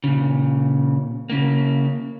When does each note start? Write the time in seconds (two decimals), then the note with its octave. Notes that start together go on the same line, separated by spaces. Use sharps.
0.04 A#2 C#3
1.30 C#3 A#3